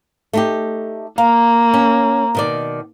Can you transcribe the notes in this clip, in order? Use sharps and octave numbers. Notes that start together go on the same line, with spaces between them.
A3 D#4 G4
A#3 F5 A#5
C#4
B2 D#3 D5